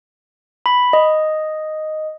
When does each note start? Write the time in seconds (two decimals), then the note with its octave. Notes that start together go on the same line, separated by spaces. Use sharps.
0.66 B5
0.93 D#5